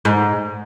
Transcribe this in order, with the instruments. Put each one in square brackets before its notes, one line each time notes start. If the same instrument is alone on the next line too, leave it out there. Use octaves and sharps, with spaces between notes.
[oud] G#2